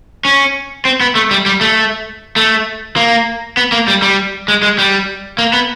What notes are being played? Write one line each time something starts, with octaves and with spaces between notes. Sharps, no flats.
C#4
C4
B3
A3
G3
G3
A3
A3
A#3
B3
A#3
G3
G3
G#3
G#3
G3
A#3
B3